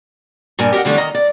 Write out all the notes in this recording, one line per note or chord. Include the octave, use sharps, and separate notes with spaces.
G2 A#2 A#4 G#5
G4 A#4 D5 D#5 F#5
E2 D3 E3 G3 A3 D4
D#3 D#5 A#5
D5